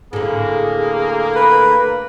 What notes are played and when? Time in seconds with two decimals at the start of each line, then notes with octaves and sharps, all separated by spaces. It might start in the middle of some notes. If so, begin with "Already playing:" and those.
0.13 A2 D3 A#3 G#4
1.36 B4